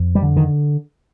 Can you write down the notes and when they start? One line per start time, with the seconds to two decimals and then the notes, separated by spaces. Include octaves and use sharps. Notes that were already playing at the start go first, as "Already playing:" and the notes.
Already playing: F2
0.15 G3
0.23 D3
0.37 D#3